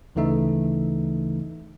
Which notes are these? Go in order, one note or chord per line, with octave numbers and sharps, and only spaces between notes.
D2 C#3 E3 A3 D#4 E5